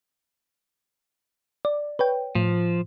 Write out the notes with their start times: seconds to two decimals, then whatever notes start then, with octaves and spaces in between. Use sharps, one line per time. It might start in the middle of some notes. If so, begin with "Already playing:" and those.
1.65 D5
1.99 B4 C#5 G5
2.35 A2 F3